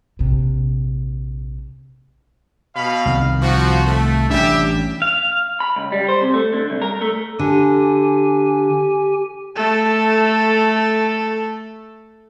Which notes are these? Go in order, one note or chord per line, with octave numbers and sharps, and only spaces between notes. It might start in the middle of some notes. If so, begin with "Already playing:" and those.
A#1 C3
B2 F5 B5
C2 D#3
F3 F#4
A3
A1 G3 C#4 D4 G4 E5
F5
B5
C#2
G3
C5
C3
A3
D3
C2
A#4
A3
D3 G4 G#5
A3 A4